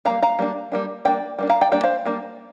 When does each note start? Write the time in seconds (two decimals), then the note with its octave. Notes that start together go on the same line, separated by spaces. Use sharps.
0.05 G3 A#3 D4 F5 A#5
0.22 F5 A#5
0.39 G3 A#3 D4
0.72 G3 A#3 D4
1.05 G3 A#3 D4 D5 G5
1.39 G3 A#3 D4
1.49 F5 A#5
1.61 D5 G5
1.72 G3 A#3 D4 D5 G5
1.83 C5 F5
2.05 G3 A#3 D4